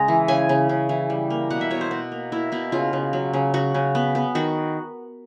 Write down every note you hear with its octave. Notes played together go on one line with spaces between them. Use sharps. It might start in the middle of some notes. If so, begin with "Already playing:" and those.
Already playing: C#3 G#3 A#5
E3
C#3 G#5
C#3
C#3
E3
G3
A#3
B2 F#5
E5
B2 C#5
C5
B2 F#4
A#3
A#3 E4
B2 E4
C#3 F4
C#3
F#3
C#3
C#3 F#4
C#3
B3
B3
D#3 F#4